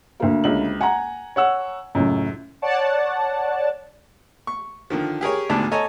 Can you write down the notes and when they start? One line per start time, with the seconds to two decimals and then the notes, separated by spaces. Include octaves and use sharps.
0.20 D2 A#3
0.44 C#2 F#7
0.81 F#5 G#5 A#5
1.36 C#5 F#5 E6
1.95 C#2 F#2 A2
2.62 C#5 D5 F#5 A5
4.47 C#6
4.90 D3 D#3 F3
5.21 G4 G#4 A#4 C#5
5.50 D2 G#2 B2 D4 A5
5.71 A4 C#5 D#5 G#5 A#5